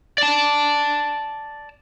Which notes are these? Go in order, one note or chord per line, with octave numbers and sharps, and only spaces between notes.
D5 A5